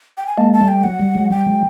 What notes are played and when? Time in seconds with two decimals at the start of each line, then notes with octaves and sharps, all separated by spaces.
0.17 G5
0.27 G#5
0.37 G#3 A#3 A5
0.53 A5
0.61 G3 A3
0.68 G5
0.84 F#3 F#5
1.00 G3
1.15 F#3 G#3
1.31 G3 G5
1.46 F#3 G#3